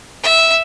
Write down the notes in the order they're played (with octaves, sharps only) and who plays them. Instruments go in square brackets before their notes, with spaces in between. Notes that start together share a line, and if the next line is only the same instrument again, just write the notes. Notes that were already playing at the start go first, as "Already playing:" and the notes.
[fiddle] E5